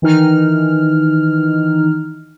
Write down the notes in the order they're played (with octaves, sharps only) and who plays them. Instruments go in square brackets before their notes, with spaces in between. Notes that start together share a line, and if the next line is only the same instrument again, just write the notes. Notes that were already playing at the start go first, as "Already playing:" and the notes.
[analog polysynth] D#3 E3 D#4 F6